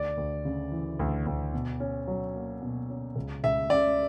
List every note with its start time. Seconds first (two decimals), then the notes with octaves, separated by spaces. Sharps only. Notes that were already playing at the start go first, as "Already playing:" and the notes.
Already playing: D2 D5
0.17 D2
0.45 C#3
0.72 E3
0.99 D2
1.26 D2
1.53 B2
1.80 C#4
2.08 F#3
2.35 A#3
2.62 B2
2.89 C#4
3.16 C#2
3.44 C#2 E5
3.70 C#3 D5